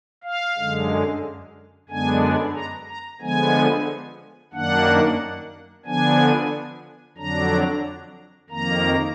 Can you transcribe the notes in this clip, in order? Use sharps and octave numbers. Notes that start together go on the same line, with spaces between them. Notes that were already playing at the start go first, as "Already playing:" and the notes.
F5
F#2 D3 G#3
F#2 D3 G#3 B3 D4 G#5
A#5
A#5
D3 F3 G#3 B3 G#5
F#2 D#3 A#3 D4 F#5
D3 F3 B3 D4 G#5
F2 D3 F#3 D4 A#5
F2 D#3 A#3 A#5